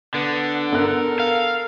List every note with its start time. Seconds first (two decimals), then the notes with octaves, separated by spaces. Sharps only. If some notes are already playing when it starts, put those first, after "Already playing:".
0.14 D3 B3
0.73 B3 A4 A#4 F#6
1.20 F5